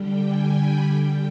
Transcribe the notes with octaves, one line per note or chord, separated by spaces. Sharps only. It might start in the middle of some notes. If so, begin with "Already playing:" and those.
Already playing: D3 G3 G5
G#5
B5
D3 G3 G5